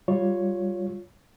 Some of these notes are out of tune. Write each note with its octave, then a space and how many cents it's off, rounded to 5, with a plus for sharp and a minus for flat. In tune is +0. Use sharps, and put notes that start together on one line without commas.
G3 +0 F4 +15 C#5 +0